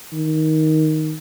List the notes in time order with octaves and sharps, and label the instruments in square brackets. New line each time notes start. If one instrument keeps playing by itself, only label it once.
[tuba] D#3